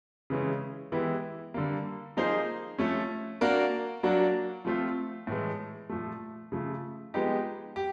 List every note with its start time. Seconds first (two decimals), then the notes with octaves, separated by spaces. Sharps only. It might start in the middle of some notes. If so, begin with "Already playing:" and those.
0.30 C#3 E3 G#3 C#4
0.92 E3 G#3 B3 E4 G4
1.54 D3 G3 A#3
2.17 F3 A#3 D#4 G#4 C5
2.78 F3 A3 C#4
3.41 A#3 D4 F#4 A#4
4.03 F#3 A#3 D4 F#4
4.65 F3 A3 C4 F4
5.27 A2 E3 G#3
5.90 A#2 F3 A3
6.52 C#3 F3 A3
7.14 F3 G#3 B3 D#4 G4
7.76 G4